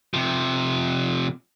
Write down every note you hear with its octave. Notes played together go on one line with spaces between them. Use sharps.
C3 F3